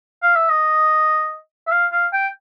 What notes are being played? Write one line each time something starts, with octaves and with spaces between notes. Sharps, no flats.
F5
E5
D#5
E5
F5
F5
G5